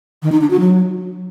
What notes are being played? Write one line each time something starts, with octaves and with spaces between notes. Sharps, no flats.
D#3
D#4
D4
F#4
F#3